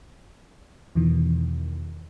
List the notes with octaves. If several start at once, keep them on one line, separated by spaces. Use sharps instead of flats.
E2 B2 D#3 E3